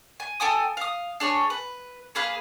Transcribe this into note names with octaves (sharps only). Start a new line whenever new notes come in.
G#5
A4 G5 G#5 D#6
F5 D#6
D4 G#4 C#5
B4
A#3 G#4 B4 F5